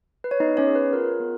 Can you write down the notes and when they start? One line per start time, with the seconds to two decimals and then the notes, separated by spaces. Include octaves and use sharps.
0.24 B4
0.31 C#5
0.40 B3 D#4 D#5
0.57 C#4 C#5
0.66 G#4
0.75 B4
0.93 F4 A#4
1.20 B3